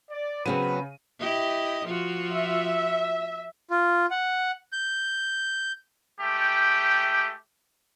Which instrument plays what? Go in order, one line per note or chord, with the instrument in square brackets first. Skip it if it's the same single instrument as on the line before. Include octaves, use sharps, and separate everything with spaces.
[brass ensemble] D5
[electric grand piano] C#3 D#7 [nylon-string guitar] F#3 B3 C4 [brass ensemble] B4
[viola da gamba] E4 G4 D#5
F3 F4 F#4
[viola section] E5
[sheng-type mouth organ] F4
F#5
G6
[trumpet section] G#3 A3 G4 G5